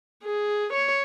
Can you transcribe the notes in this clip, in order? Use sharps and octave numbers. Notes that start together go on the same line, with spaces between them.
G#4
C#5